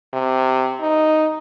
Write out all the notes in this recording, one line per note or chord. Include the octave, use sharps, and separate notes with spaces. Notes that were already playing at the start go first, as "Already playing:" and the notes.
C3
D#4